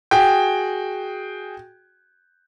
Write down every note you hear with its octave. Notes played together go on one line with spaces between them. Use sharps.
F#4 G#4 G5